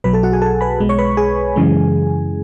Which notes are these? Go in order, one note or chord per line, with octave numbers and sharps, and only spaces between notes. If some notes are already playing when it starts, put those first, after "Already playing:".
B1 B2 F#3 B4 B5
A4 A5
F#4 F#5
G#4 G#5
A4 A5
B4 B5
B1 B2 G#3
C#5 C#6
B4 B5
G#4 G#5
F#2 C#3 E3 G#3